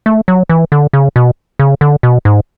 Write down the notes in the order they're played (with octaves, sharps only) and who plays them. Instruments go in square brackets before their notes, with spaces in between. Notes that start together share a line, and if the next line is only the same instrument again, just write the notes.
[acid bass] A3
F#3
E3
D3
C#3
B2
C#3
D3
B2
G#2